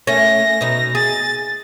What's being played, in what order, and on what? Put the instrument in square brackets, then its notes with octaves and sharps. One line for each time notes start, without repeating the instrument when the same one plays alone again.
[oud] A3 C#4 [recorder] A#6
[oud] B2 D#4
[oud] G#4 [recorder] A6